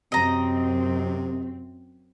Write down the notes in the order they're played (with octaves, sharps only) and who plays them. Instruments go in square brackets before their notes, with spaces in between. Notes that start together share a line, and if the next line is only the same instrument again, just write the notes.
[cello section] F#2 C4 [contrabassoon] C3 [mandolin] D#5 A#5